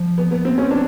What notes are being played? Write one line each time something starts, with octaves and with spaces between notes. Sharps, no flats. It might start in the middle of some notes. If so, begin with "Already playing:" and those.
Already playing: F3
B3
B3
C4
C#4
D4